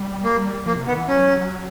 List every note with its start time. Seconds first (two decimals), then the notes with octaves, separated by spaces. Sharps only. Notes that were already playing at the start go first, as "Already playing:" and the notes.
Already playing: G3
0.24 A#3
0.66 F3 A#3
0.76 C3
0.87 D#3 B3
0.98 E3
1.08 F#3 C#4